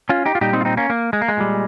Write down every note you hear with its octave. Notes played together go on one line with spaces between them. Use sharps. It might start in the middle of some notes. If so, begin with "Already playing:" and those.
C#4 F4
D#4 G4
F4
A#2 G3 D#4 G4
C4 D#4
F4
C4 D#4
A#3 C#4
A#3
G#3
A#3
G#3
A#2 G3